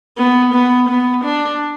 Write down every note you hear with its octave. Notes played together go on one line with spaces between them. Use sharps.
B3
B3
B3
D4